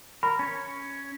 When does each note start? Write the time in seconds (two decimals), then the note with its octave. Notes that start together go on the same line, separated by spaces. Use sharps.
0.23 A#4 B5
0.39 C#4 C#5